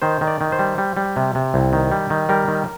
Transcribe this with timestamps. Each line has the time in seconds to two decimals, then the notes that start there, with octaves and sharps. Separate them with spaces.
0.02 D#3 C5
0.21 D#3
0.27 D5
0.41 D#3
0.52 C5
0.59 G3
0.78 G3
0.97 G3
1.16 C3
1.35 C3
1.54 C2
1.73 D#3
1.92 G3
2.10 D#3
2.29 G3 A#4
2.48 D#3